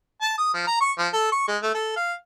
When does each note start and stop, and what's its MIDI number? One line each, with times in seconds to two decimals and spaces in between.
0.22 0.35 81
0.38 0.52 87
0.54 0.64 53
0.67 0.78 82
0.81 0.92 85
0.99 1.08 53
1.13 1.29 69
1.32 1.44 85
1.48 1.57 56
1.62 1.72 57
1.74 1.95 69
1.96 2.14 77